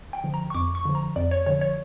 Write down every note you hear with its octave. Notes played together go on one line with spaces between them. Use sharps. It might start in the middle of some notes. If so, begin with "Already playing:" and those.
G5
D3 F3
A#5
C#6
F2 D6
C#6
D3 F3
A#5
F2 D5
C#5
D3 F3 C#5
C#5